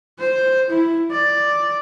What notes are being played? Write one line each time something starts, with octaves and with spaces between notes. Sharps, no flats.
C5
E4
D5